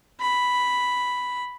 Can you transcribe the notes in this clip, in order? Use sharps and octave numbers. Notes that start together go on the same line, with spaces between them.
B5